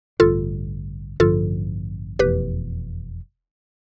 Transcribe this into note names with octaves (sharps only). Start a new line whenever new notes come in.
A1 G2 D3 F4 A4
A1 G2 D3 F3 F4 A4
F1 E2 B2 G4 B4